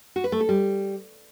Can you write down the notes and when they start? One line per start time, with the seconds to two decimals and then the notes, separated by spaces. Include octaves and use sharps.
0.16 F#4
0.24 B4
0.32 A3
0.41 A4
0.49 G3